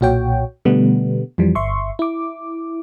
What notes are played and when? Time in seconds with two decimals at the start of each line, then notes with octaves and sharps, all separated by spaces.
0.01 B1 A#2 F#4 C#5 G5
0.65 B2 D3 G3 A3 B3
1.38 F2 E3 F3 G3
1.55 G1 E5 C6 C#6
1.99 E4 D6